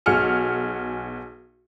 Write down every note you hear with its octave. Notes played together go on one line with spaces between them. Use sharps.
B1 F#4 G#4 F6 C#7